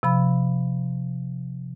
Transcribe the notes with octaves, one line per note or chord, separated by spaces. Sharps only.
C3 F3 B5